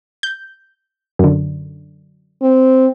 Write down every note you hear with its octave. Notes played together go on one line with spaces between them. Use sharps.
G6
F#2 D3
C4